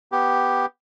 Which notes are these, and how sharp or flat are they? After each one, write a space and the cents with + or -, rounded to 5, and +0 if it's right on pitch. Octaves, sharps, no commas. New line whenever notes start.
B3 +0 G4 +0